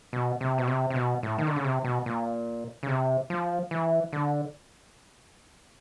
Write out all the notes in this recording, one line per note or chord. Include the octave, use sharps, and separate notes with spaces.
B2
C3
B2
C3
C3
B2
A2
D#3
D3
C#3
C3
B2
A#2
C#3
C3
F3
E3
D3